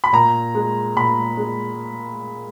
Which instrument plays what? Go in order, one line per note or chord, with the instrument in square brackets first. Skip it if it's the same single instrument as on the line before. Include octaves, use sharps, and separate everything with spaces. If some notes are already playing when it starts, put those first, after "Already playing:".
[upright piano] B5
A#2 A#5
G#3
A#2 B5
G#3